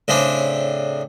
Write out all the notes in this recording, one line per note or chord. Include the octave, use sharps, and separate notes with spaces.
A2 C#3 C4 D4